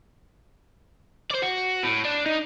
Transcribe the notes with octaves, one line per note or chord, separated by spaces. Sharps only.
C5 D5
F#4
A2
D4
D#4